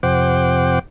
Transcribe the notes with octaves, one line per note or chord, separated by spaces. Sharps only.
F2 C3 C5 F#5 G5 D6